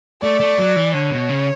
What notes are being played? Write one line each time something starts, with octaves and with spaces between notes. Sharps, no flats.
A3 D5
A3
F#3
E3
D3 C#5
B2
C#3